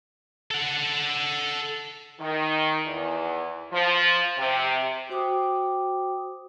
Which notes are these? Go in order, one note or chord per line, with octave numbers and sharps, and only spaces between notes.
A4 F#5
D#3
E2
F3
C3
F#4 C5 G5 D6 D#6